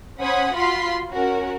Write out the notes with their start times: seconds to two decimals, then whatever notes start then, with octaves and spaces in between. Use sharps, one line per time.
0.19 C#4 C5 F#5 B5 D#6 G#6
0.53 F4 F#4 B5 C6 B6
1.11 C#4 F#4 A#4